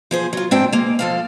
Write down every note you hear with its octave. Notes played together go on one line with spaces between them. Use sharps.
F3 G#4 C5
F#3 F4
G#2 C4 D4 C5 G5
G#3 A#3
F3 A4 F5